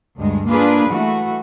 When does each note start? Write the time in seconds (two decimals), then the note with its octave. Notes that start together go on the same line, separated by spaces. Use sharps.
0.17 D2 G2 G#3
0.46 A#3 D4 F4 G#4 B4
0.89 E3 A3 F#4